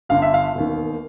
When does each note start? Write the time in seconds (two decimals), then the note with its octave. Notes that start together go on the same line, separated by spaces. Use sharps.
0.09 G1 G2 D3 F5
0.22 E5
0.34 F5
0.55 E1 D#2 D#3